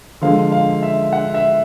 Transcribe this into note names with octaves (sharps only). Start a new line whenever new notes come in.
D3 F3 G#3 F5
F5
E5
F#5
E5